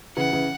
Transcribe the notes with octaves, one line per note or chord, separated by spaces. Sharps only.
C#3 E3 F#5
C#3 E3